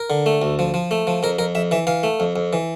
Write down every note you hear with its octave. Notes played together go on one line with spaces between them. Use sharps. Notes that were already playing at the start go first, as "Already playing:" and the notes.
Already playing: A#4
D3
A3
D2
F3
F3
A3
F3
F2 A#4
F2 A#4
F2 E5
E3 E5
E3 F5
A3
F2
F2
E3